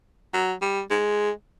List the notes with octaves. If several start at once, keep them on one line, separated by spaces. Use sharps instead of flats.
F#3
G3
G#3